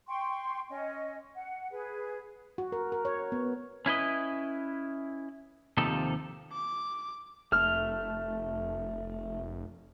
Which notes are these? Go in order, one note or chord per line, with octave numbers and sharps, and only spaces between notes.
G5 C6 C#6
C#4 D#5
F#5
G#4 B4
F#4
A#4
A#4
C#5
B3
C#4 E4 B4 D#5
D#2 C3 F3 D#4 A4
D6
F1 A3 F6